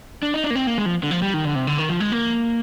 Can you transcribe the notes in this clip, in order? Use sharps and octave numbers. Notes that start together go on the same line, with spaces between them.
D4
D#4
D4
A#3
C4
A#3
G#3
F3
D3
F3
G3
D#3
D3
C3
D3
D#3
F3
G#3
A#3